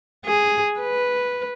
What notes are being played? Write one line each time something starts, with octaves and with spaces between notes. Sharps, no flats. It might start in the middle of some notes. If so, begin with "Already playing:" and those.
G#4
B4